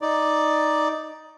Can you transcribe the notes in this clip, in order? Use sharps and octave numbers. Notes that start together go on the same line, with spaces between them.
D#4 D5